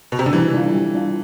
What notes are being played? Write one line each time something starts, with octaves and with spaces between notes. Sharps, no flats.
B2
C3
D3
E3 G3
D4 F4
G3
D4 F4